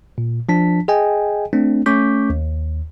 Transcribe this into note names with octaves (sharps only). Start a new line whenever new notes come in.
A#2
F3 D4 A5 B6
G#4 D#5 G5 G#5
A3 C4 D4
A3 C#4 C#6 D6 G6 B6
D#2